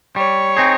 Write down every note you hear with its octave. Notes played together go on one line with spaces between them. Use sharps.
G3 C#5
C4 D#4 G#4